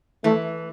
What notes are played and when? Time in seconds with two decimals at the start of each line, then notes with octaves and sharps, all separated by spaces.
0.24 E3 A3